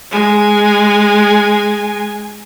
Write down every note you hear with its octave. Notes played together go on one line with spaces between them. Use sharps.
G#3 G#5